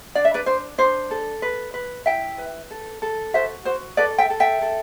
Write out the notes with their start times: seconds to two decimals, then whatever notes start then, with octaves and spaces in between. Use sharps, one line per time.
0.15 D4 D5
0.25 E5
0.34 B4 D5
0.46 D4 C5
0.78 D4 C5
1.11 A4
1.42 B4
1.74 B4
2.06 E4 E5 G5
2.38 B4
2.71 A4
3.02 A4
3.34 F#4 C5 E5
3.65 F#4 C5
3.97 A4 B4 D5
4.18 E5 G5
4.30 A4
4.40 E5 G5
4.62 A4